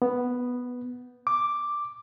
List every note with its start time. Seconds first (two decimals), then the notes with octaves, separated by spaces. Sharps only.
0.02 B3
1.27 D6